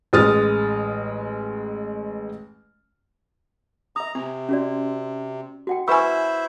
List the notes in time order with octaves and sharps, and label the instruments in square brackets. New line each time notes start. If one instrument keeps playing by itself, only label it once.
[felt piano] A1 G#3 D#6 F6 A6
[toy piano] E5 D#6 [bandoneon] A#5
[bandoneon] C3 [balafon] C4
[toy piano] C#4 F#4 D5
F#4 F#5 G5
[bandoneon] E4 C5 E5 [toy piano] B4 C#6 E6 [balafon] G#5 B5